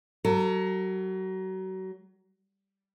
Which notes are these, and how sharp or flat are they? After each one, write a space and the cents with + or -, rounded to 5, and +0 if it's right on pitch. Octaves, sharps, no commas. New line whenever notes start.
F#3 +30 A4 +45